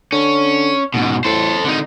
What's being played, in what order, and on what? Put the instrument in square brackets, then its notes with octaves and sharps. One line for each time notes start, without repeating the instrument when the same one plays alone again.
[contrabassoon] D3 [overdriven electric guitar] C#4
[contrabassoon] F#1 [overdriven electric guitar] G#2 B2
[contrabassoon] A2 [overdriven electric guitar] A4 C5
[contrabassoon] G#1 [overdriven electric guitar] D3 D#4